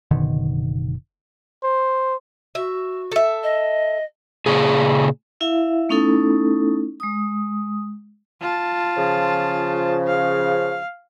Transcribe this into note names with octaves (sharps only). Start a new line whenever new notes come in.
F#1 B2 D3 D#3
C5
F#4 E5
A4 E5
D#5
A#2 C#3 G#4
E4 E5 F5
A3 B3 C#4 D#4 E4 A4
G#3 D#6
F4 A5
C#3 F3
F5